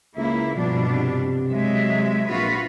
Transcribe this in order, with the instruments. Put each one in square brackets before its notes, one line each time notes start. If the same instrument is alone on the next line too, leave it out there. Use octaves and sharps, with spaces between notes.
[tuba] C#2 [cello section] A#3 E4
[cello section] G2 B2 D4 [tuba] F3
[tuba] C3
[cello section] F#3 G#3 E5
[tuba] A#1 [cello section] F4 F#4 B4